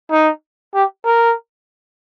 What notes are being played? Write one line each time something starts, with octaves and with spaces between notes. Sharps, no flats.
D#4
G4
A#4